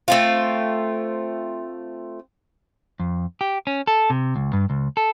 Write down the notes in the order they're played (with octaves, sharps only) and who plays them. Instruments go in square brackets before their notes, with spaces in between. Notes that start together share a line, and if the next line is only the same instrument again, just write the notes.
[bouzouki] A3 C4 F4
[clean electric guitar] F2
G4
C#4
A4
C3
C#2
G2
C#2
A4